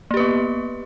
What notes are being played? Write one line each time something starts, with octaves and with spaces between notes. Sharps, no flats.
A#3 B3 G4 B4